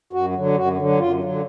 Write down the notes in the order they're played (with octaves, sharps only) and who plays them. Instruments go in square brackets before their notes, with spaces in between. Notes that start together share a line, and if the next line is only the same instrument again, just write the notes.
[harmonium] F#2 F#4
D3 F#3
F#2 F#4
D3 F#3
F#2 F4
D3 F#3